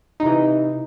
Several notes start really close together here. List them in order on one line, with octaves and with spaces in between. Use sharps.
D#4 C3 E3